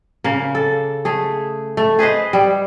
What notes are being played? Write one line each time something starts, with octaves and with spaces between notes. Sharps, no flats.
C#3 A#3
A4
A3 G#4
A3
G#4 B4 C5 D#5
G3